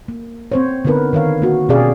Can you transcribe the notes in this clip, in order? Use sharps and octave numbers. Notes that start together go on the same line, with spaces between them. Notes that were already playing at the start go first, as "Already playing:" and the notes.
A#3
C4 C5 C#5
D3 B3 D#4 A#4 B4
D#3 A#4 C#5 F5
A#3 F#4
B2 C#4 G4 G#4 D5 F5